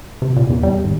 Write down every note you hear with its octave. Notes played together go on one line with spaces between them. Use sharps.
C3
A#2
E2
G3
G#1